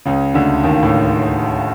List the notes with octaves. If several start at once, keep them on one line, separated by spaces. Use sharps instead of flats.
C#2 C#3
D2 D3
D#2 D#3
A2